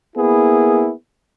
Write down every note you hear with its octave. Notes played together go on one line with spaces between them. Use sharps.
A#3 B3 E4 G#4